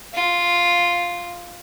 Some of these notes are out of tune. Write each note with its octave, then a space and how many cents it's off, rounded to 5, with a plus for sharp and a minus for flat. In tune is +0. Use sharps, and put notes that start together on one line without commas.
F4 +0